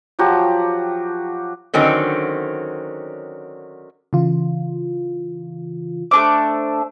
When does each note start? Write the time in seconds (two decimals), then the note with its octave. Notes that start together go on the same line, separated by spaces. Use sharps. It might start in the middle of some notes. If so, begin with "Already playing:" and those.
0.19 F3 F#3 F#4 G4
1.74 D3 D#3 F#3 C4 C#4
4.13 C#3 E3 F4
6.11 A3 D4 C5 D6 E6